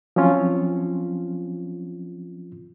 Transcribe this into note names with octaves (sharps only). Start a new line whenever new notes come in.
F3 F#3 C4 C#4 F4